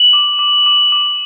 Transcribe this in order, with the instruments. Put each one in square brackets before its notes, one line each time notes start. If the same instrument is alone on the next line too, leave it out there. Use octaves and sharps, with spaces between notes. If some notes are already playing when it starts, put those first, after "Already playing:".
Already playing: [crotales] F#7
D6
D6
D6
D6